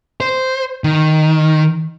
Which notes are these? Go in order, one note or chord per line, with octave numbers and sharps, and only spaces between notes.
C5
D#3